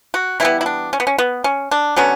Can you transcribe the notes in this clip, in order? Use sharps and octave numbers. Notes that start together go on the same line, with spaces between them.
F#4
E3 G3 B3 E4
E4
D4
C#4
B3
C#4
B3
C#4
D4
D3 F#3 B3 C#4